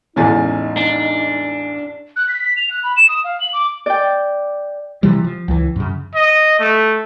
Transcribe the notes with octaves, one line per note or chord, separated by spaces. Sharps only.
A1 E2 C#3 G#3 D#4 G#5 A6
D4
F#6
B6
B6
F7
F#6
B5
E7
D#6
F5
F#7
D6
D5 G5
C3 E3 F3 G3
F3
C#2 E3
F#2 C#3
D#5
A3